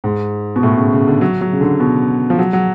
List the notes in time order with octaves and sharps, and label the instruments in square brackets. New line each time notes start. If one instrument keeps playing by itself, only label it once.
[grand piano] G#2
B2
A2
C#3
C#3
D3
F#3
F#3
C#3
D3
B2
F3
F#3
F#3